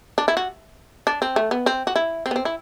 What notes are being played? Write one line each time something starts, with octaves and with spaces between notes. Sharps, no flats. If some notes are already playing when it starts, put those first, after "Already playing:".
D4
E4
F#4
D4
C4
A3
B3
C4
F#4
E4
C4
B3
C4
E4